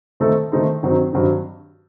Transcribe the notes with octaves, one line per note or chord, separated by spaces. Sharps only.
D#3 A3 D#4 A4 C5
D#3 A3 D#4 A4 C5
G2 D#3 F#3 C4 D#4
G2 D#3 F#3 C4 D#4